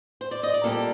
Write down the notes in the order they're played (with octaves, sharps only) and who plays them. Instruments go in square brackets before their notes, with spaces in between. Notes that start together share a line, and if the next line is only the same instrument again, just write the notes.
[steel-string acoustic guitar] C5
D5
D#5
D5
A#2 G3 A#3 A4